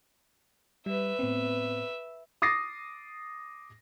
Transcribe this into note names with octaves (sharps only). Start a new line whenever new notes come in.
G3 B4 E5
A2 B3 C4
D6 D#6 A6 A#6 C7